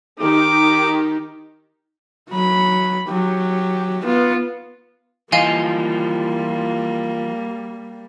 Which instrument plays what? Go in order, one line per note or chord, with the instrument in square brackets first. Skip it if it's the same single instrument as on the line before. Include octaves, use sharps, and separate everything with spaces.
[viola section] D#3 D#4 G4 [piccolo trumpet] D6
[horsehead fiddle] F#3 B5
F#3 G4
B3 F4
[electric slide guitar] E3 F3 F4 [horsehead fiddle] G3 A#3 [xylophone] D#5 F5 G#5